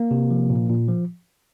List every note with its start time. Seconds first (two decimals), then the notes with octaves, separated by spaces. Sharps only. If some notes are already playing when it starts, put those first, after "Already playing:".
Already playing: A#3
0.11 C3
0.30 F3
0.50 A#2
0.69 A#2
0.88 F3